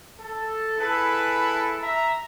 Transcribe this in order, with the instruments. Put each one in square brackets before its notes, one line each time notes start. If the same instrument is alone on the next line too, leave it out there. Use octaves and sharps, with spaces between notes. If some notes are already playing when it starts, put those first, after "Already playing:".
[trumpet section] A4
E4 G#4 A4 B4
E5 A#5